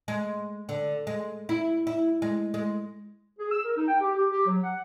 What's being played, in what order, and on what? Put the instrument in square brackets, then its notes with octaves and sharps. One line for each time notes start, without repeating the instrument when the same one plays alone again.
[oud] G#3
D3
G#3
E4
E4
G#3
G#3
[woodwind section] G#4
E6
A#4
D#4
G5
G4
G4
G4
F#3
F#5